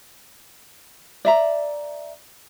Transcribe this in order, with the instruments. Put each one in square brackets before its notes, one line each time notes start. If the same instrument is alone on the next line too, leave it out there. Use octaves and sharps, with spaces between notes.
[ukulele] D5 E5 A#5